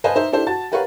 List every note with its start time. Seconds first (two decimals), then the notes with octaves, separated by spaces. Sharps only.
0.04 B4 C5 D#5 F5 G#5 A5
0.16 D#4 C5 E5
0.33 D4 E4 G4 A4 C5
0.46 F#4 A5 A6
0.72 G4 A#4 B4 C#5 F5 F#5